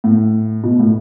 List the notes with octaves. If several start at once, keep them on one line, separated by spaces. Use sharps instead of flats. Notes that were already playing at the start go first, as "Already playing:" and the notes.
A2
B2
A2